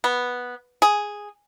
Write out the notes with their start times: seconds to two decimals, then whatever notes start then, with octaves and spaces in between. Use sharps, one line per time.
0.04 B3
0.82 G#4